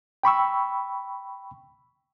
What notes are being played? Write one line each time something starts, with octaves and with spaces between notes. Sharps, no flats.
G5 B5 C#6 E6